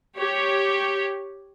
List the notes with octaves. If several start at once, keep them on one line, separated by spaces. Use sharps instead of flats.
G4 C#5